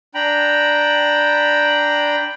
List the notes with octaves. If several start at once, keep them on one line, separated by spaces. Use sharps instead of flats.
D4 G5 A#5 B5